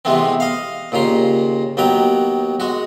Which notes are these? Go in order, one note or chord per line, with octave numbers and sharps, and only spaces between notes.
C3 E3 G#3 A3 B3 C4
D#5 F5
D#2 A#2 C#3 A#5 C6
D#2 F#3 B3 G5 A#5
G#3 F#4